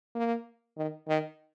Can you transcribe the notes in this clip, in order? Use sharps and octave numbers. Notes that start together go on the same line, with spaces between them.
A#3
D#3
D#3